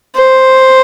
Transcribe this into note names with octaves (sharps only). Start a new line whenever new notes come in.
C5